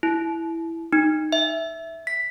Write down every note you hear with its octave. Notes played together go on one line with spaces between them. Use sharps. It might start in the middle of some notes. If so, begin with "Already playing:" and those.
E4
D#4
E5
B6